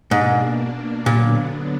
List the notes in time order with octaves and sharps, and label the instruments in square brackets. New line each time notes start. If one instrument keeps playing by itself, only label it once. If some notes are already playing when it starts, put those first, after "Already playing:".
[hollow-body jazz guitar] G#2 [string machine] B2 A#3 D4
[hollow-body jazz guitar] A#2 [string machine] D3 F#3 B3 D4